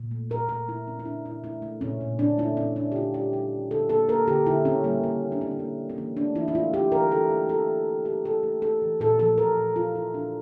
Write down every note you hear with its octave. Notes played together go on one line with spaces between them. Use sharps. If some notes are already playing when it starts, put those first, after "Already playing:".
Already playing: A#2
A3
A#2 A#4
A#2 A#4
A3 E4
A3 C#4
E4
A#2 D4
A#2 E4
A3 E4
A3
A#2 C#4
A#2
A#2 D4
A3 E4
A#2 C#4
A3 D4
G4
D3 F4
G3 G4
G3 G4
G3
D3 A4
A#3 A4
A#3 A#4
D3 G4
D3 E4
D3 C#4
G3 A#3
G3 A#3
A#3
D4
G3 C#4
C#4
D3 A#3
D3
C#4
E3 A#3
A3 D4
E3 E4
E4
A3 F4
A3 G4
E3 A#4
E3 A4
A3
E3 A4
E3
E3
A3 G4
A3 A4
A3
A3 A4
E3
A#2 A4
F3 A4
A#2 A#4
A#2
A#2 F4
F3 E4
A#2 D4